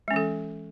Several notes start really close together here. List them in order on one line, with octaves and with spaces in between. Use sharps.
G#3 C#4 E3 A4